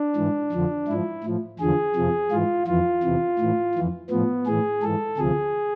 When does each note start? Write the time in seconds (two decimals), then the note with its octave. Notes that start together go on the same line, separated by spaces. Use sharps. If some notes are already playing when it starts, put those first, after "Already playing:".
Already playing: D4
0.16 G#2 E3
0.52 F2 D3 F3
0.88 G#2 F3 E4
1.23 A2 F3
1.60 E2 D3 F3 G#4
1.95 F2 C3 F3
2.31 G#2 E3 F4
2.67 F2 E3 F4
3.03 E2 C3 E3
3.39 A2 E3
3.75 F2 E3
4.10 A2 F3 B3
4.46 A2 E3 G#4
4.82 G#2 E3 A4
5.18 D2 C3 F3 G#4